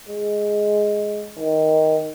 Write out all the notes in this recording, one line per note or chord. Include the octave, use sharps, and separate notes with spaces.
G#3
D#3